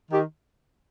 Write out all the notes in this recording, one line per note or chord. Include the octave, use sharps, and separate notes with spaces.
D#3 G4